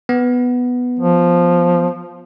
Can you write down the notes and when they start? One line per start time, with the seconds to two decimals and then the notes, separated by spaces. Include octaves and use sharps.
0.09 B3
1.00 F3